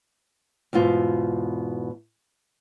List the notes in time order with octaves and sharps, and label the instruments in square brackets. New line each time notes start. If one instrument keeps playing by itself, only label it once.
[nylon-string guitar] E2 G#2 B2 F4